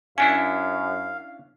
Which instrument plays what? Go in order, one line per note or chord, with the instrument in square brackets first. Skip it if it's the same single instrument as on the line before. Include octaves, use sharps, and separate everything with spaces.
[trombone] F#2 [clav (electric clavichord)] C#4 D4 E4 [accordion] F5 [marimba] G#5